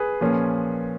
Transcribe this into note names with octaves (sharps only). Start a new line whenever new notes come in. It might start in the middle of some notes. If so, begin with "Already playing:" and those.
Already playing: G#4 B4
A#2 F3 A#3 C#4